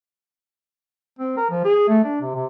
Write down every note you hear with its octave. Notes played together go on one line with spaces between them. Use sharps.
C4
A#4
F3
G#4
A3
D4
C3
C3